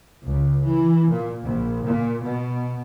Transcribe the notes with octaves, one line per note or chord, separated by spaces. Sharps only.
C#2
E3
A#2
A#1
A#2
B2